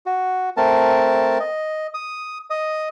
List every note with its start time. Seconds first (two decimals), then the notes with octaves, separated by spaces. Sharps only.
0.06 F#4
0.57 A3 C4 A#4 A5
1.40 D#5
1.94 D#6
2.50 D#5 D#6